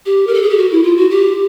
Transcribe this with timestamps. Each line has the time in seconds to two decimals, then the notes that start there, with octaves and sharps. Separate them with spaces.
0.06 G4
0.27 A#4
0.34 A4
0.43 G#4
0.50 G4
0.57 F#4
0.72 E4
0.84 F4
0.97 F#4
1.10 G4